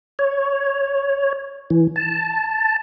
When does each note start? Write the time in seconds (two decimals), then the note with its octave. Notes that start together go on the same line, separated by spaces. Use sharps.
0.19 C#5
1.70 E3
1.96 A5